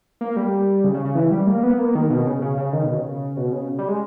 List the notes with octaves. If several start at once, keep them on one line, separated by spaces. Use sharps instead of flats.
A#3
G3
C#3
C#3
C#3
E3
G3
A#3
B3
A#3
D#3
B2
C#3
C#3
C#3
D#3
B2
C#3
B2
C#3
G3
G#3